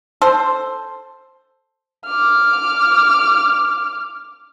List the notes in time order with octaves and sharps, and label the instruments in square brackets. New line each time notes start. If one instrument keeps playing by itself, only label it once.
[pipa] A4 C5
[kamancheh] D6 F6